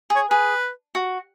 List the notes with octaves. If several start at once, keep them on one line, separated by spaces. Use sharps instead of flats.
G#4
C#5
G#4 B4
F#4